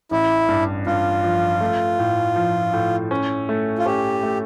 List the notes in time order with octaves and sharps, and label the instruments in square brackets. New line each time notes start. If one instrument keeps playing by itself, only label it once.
[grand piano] A1 [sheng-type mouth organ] E4
[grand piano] G2
[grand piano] G2 [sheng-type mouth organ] F4
[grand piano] F3
A3
A2
F3
A2
C#4
A3
[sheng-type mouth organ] F4
[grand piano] C#4 [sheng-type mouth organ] G4
[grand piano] A3